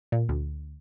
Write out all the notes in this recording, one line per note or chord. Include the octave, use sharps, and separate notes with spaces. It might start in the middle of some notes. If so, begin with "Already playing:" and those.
A#2
D2